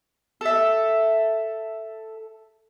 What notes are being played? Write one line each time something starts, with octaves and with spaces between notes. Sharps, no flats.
A4 E5